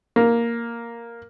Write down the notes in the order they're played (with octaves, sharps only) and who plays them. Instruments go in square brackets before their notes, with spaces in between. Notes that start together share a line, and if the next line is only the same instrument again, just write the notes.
[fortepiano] A#3